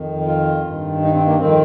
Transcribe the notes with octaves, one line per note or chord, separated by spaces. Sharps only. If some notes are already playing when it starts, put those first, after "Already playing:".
Already playing: F2 D#3
F4
G2 D#3
D#4
C4
A#3
F2 D#3 C4